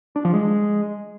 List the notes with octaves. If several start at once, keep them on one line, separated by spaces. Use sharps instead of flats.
D4
F3
G#3